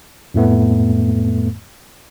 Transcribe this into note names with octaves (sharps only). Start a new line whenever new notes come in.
F2 A2 A3 B3